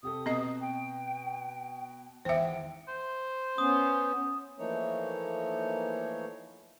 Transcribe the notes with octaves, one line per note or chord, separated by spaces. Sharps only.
C3 G4 A4 D#6
B2 C4 D#5
G5
G#1 E2 C5 E5 G5
C5
B3 C#4 D#6
E3 F3 A3 A#3 D#4 C#5